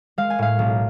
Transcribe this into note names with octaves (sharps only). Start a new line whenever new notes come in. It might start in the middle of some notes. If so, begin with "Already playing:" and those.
G#3 F5
G#5
A2 F5
B1